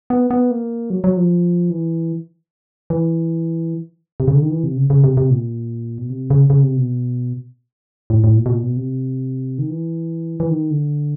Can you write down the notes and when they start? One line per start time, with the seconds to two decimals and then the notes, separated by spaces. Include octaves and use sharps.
0.10 B3
0.31 B3
0.51 A#3
0.90 F#3
1.04 F#3
1.17 F3
1.70 E3
2.90 E3
4.20 C3
4.28 C#3
4.35 D3
4.43 D#3
4.50 E3
4.64 C3
4.77 C#3
4.90 C#3
5.04 C3
5.17 C3
5.30 A#2
5.98 B2
6.10 C3
6.30 C#3
6.50 C#3
6.63 C3
6.77 B2
8.10 A2
8.24 A2
8.37 A#2
8.46 B2
8.50 A#2
8.63 B2
8.77 C3
9.58 D#3
9.70 E3
10.40 E3
10.50 D#3
10.71 D3